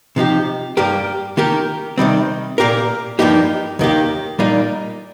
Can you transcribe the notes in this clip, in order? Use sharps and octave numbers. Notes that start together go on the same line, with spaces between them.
C3 F3 D#4 G4
G2 G3 A#3 G4 A#4
D#3 A#3 G4 A#4
C3 D#3 G3 C4
A#2 A#3 G4 A#4
G2 F3 A#3 D#4 G4
D#2 D#3 A#3 G4
A#2 G3 A#3 D#4